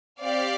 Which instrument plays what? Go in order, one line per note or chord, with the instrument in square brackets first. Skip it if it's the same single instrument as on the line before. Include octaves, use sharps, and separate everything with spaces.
[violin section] C4 G4 D5 F5